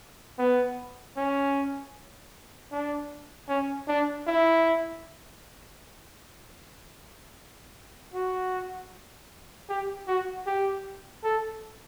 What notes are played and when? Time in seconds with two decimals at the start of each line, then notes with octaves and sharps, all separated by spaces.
0.39 B3
1.17 C#4
2.72 D4
3.49 C#4
3.88 D4
4.27 E4
8.14 F#4
9.69 G4
10.08 F#4
10.47 G4
11.24 A4